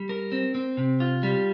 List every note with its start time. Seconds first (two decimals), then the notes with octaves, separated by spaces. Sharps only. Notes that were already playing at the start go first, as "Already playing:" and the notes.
Already playing: G3
0.09 A#4
0.32 C4
0.55 C4
0.77 C3
1.00 F4
1.23 G3